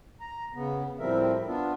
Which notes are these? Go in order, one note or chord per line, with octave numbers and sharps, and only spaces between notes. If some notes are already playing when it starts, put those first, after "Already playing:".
A#5
C#3 B3
A2 F3 G3 C4 A#4 E5
B3 D4 F4